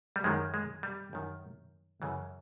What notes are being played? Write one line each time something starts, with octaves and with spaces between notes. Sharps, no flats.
G3
F#2 D#3 G#3
G#3
G3
F#2 D#3
F#2 C#3 E3